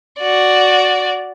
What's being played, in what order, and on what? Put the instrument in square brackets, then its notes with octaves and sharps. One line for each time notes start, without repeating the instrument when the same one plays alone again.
[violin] F#4 D5